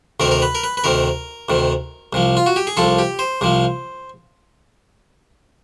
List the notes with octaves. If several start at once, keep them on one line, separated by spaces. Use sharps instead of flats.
D2 C3 D#3 A#4
A#4
B4
A#4
B4
B4
D2 C3 D#3 A#4
D2 C3 D#3
C2 C3 F3
F4
F#4
G4
G#4
C2 C3 F3 A4
G4
C5
C2 C3 F3